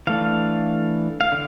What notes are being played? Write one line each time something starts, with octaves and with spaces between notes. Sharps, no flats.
E3 A3 D4 F5
F5
D3